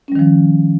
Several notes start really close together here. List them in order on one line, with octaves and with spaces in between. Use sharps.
C#4 G3 D#3 F3